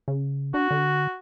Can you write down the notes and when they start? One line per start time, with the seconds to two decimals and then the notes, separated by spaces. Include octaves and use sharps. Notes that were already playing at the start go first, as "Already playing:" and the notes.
0.08 C#3
0.54 D4 F#4
0.71 D3